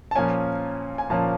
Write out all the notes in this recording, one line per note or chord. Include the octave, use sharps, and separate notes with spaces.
A5
A#2 F3 A#3 C#4 G#5
G#5
A#2 F3 A#3 C#4 A5